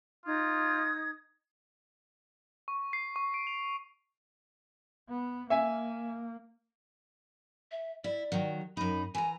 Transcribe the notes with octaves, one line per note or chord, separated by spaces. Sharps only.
D#4 F4 D#6 G#6
C#6
C7
C#6
D7
F7
B3
A#3 E5 G#5
E5
E4 D5
D#3 F#3
F#2 D#4 B5
E3 G#5 A#5